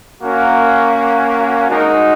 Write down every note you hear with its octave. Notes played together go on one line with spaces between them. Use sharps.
A#3 C#4 F#4 A#4
G#3 D#4 F#4 A#4